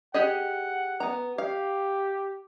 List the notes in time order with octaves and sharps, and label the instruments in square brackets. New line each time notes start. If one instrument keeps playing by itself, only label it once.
[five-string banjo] G4 G#4 D#5 [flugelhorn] F#5
[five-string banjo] B3 A#5
[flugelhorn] G4 [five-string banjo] F5